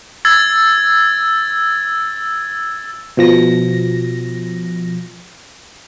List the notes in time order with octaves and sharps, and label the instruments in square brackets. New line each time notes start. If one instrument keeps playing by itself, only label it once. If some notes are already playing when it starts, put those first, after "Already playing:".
[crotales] E6 G#6 A6
[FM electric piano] B2 F3 A#6